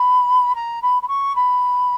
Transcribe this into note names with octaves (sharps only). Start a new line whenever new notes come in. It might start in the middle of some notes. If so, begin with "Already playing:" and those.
Already playing: B5
A#5
B5
B5
C#6
B5